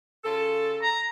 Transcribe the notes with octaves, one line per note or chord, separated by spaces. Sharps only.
C#3 F4 A4
A#5